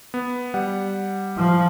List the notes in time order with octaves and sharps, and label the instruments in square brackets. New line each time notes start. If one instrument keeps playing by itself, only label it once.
[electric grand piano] B3
G3 F#5
[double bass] F3